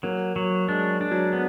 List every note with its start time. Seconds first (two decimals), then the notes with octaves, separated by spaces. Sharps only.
0.03 F#3 A#3
0.36 F#3
0.68 G#3 D4
1.01 D4
1.11 F#3
1.33 B3